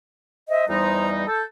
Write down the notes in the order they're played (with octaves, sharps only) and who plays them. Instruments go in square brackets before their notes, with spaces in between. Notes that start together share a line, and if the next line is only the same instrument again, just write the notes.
[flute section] C5 D#5 E5
[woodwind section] E2 G3 D#4 [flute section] C5 A#5
[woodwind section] A4 [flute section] G6